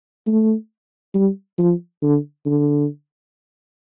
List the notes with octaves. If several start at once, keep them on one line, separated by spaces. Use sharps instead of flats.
A3
G3
F3
D3
D3